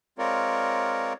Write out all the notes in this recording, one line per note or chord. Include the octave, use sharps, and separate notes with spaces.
G#3 C4 F4 A#4 C#5 D5